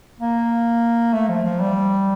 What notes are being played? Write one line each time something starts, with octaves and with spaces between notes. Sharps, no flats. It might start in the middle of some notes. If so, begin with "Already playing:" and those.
A#3
A3
F3
F3
G3